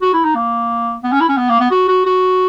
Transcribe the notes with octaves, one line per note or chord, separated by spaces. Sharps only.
F#4
E4
D#4
A#3
B3
C#4
E4
C#4
B3
A#3
B3
F#4
F#4
F#4